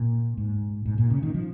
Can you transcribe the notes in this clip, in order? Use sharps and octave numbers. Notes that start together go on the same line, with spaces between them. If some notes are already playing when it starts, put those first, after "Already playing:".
Already playing: A#2
G#2
G#2
A#2
C#3
D#3
F3